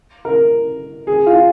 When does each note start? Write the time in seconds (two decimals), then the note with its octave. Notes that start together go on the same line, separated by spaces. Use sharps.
0.25 A#4
1.07 G#4
1.26 F4